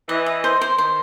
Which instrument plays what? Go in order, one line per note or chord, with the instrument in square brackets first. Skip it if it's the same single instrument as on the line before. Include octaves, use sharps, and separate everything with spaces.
[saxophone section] E3 [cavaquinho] D#5
[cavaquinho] D#5
C5
C5
[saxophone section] D#3 [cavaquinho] C5